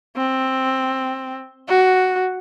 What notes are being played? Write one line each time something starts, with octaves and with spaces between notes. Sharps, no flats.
C4
F#4